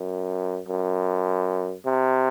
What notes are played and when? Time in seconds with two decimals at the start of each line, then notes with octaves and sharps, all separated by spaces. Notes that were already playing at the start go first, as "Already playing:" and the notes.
Already playing: F#2
0.68 F#2
1.86 C3